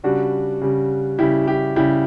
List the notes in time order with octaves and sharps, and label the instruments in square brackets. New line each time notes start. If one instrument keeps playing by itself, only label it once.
[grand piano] C#3 G3 D4 F#4
C#3 G3
C#3 G3 E4 G4
E4 G4
C#3 G3 E4 G4